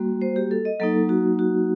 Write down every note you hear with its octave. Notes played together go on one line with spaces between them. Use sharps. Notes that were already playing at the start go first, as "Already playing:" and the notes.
Already playing: G3 A#3 F#4
C5
G4
A4
D#5
F#3 A#3 D#4 A4
F#4
F#4